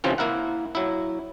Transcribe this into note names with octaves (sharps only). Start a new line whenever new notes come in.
C3 E3 F3 C4 C#4
A#3 E4 A#4 F#5
F#3 E4